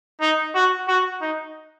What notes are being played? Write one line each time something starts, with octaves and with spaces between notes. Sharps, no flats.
D#4
F#4
F#4
D#4